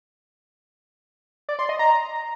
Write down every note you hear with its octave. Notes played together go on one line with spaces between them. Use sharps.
D5
C6
D#5
A#5